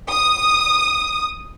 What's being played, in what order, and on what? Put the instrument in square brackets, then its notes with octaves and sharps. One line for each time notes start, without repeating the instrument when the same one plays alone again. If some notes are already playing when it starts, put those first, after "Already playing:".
[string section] D#6